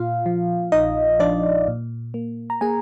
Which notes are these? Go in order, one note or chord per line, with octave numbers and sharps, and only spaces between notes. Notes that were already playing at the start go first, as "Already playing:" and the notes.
Already playing: A#2 F4 F5
F3
A#1 D#4 D#5
F3 D4 D5
A#2
A#3
A#5
A#3 G#4 G#5